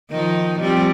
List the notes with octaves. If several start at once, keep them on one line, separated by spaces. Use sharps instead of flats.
D#3 F3 D#4
F3 G3 C4